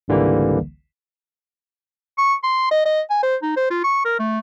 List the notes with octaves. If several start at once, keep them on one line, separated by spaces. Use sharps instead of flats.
G#1 C#2 D3 E3 G3 A#3
C#6
C6
D#5
D#5
G#5
C5
D#4
C5
F4
C#6
A#4
A3